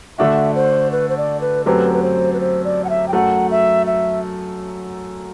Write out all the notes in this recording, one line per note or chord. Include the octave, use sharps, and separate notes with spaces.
D3 A3 D4 F#4 E5
C5
B4
C5
D5
B4
F#2 F#3 A3 C4 G4 B4
B4
C5
B4
C5
D5
F#5
E5
G5
F#2 F#3 A3 F#5
E5
E5